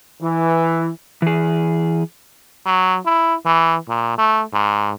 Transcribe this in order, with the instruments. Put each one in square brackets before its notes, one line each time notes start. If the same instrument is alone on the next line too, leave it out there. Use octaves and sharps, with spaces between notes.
[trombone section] E3
[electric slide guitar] E3 G#4
[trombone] F#3
E4
E3
A#2
A3
G#2